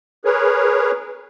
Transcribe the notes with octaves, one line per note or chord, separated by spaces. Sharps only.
G#4 A#4 B4 C#5